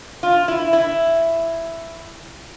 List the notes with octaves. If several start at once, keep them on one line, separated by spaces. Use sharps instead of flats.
F4
E4
E4